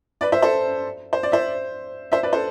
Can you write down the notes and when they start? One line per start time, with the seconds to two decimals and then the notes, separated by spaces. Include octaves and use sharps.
0.21 B4 D5
0.32 C5 E5
0.42 A4 C5
1.13 C5
1.23 D5
1.32 C5 E5
2.12 C5 E5
2.23 B4 D5
2.33 A4 C5